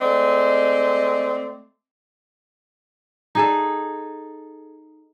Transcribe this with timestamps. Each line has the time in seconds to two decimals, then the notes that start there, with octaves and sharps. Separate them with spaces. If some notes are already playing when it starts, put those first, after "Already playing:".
0.02 G#3 A3 C4 D5 D#5
3.35 D#4 G#4 A4